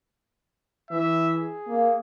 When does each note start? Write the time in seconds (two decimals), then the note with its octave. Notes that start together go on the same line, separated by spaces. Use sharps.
0.91 E3 E5
1.36 G#4
1.68 A#3